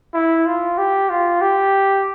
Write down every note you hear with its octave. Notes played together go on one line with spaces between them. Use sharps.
E4
F4
G4
F4
G4